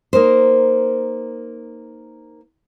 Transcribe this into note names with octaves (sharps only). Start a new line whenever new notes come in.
A#3 D#4 A#4 C5